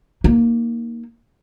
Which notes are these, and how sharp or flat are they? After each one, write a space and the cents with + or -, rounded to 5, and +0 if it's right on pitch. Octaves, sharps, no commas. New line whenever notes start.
A#3 +0 D#4 +0